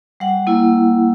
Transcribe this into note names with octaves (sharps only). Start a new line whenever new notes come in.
G3 F#5
A#3 E4